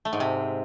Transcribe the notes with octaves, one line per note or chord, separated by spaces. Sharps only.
A3
G#2
C3